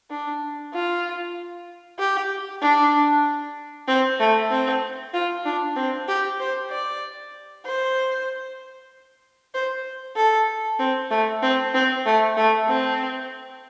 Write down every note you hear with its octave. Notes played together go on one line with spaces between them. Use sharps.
D4
F4
G4
D4
C4
A3
C4
F4
D4
C4
G4
C5
D5
C5
C5
A4
C4
A3
C4
C4
A3
A3
C4